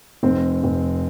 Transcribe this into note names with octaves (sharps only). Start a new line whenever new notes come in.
F1 C4
F1